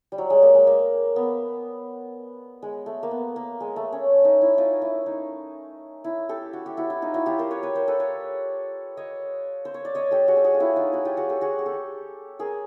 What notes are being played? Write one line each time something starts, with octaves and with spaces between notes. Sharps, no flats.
G3
F#3
G#3
A#3
G#3
A#3
B3
G#3
A3
A#3
B3
A#3
G#3
A3
C#4
D#4
E4
D#4 F4
E4
D#4
E4
G4 A4
F#4
G4
E4 F#4
E4
D#4 F4
E4 F#4
F4 G4
A#4 C5
B4 C#5
B4 C#5
A#4 C5
A4 B4
B4 C#5
C#5 D#5
C5
C#5
D5
C#5 D#5
G4 A4
F#4 G#4
A4
F#4 G#4
F4
E4 F#4
D#4 F4
E4 F#4
F4 G4
F#4 G#4
G4 A4
F#4 G#4
G#4
G4 A4
G#4 A#4